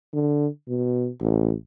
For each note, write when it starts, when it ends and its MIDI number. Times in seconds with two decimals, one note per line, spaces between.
0.13 0.47 50
0.68 1.10 47
1.21 1.54 33